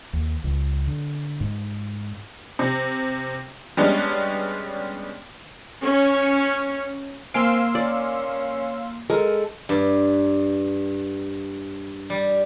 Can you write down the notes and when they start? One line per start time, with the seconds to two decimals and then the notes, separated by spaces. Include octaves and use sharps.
0.13 D#2
0.44 C#2
0.87 D3
1.41 G#2
2.59 C3
3.77 G3 G#3 B3 C#4 D4
5.83 C#4
7.34 A#3 C4 F5 G#5 C6 E6 D7
7.75 C#4 D5
9.10 G#3 A4 A#4
9.69 G2
12.10 G3